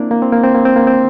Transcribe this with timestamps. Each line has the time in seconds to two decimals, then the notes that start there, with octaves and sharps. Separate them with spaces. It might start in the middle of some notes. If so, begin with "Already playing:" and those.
Already playing: A#3 C4 D4 E4
0.11 A#3
0.22 C4
0.32 A#3
0.43 C4
0.55 A#3
0.65 C4
0.76 A#3
0.87 C4